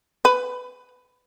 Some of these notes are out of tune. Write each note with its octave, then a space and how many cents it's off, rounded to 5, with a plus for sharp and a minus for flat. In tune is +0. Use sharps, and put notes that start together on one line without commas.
B4 +15